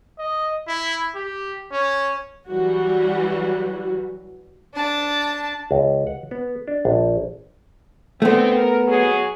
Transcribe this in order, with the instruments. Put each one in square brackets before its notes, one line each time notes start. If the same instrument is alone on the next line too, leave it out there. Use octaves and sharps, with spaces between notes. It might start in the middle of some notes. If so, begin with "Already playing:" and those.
[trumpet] D#5
E4
G4
C#4
[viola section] E3 F#3 G3 F#4
[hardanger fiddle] D4 A5
[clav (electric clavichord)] C#2
F#5
B3
D4
A#1
[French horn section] D3 C4 [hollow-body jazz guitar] A3 B3
[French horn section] A#4
F#3 F#4 G#4